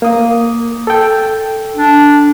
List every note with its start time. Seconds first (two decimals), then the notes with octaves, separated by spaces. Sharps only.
0.02 A#3 D#6
0.87 A4 G5
1.76 D4